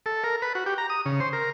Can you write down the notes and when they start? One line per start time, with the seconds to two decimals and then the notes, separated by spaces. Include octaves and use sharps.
0.06 A4
0.24 A#4
0.42 B4
0.55 F#4
0.66 G4
0.78 A#5
0.90 D#6
1.06 C#3
1.20 C5
1.33 A#4